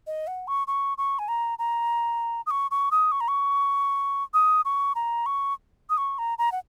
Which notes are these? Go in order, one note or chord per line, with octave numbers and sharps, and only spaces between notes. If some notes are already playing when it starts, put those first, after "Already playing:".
D#5
F#5
C#6
C#6
C#6
G#5
A#5
A#5
D#6
C#6
C#6
D#6
C#6
A#5
C#6
D#6
C#6
A#5
C#6
D#6
C#6
A#5
A#5
F#5